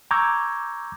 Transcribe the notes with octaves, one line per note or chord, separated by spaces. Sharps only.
A#5 C#6 D6 E6 G6 G#6